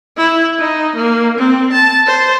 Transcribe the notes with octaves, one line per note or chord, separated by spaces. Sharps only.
E4
D#4
A#3
C4
A5
C5